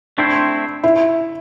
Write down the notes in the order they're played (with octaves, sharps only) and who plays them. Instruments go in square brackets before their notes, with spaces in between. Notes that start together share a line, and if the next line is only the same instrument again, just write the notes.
[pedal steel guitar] A3 C4 E4 C5 [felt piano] D4
[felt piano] E4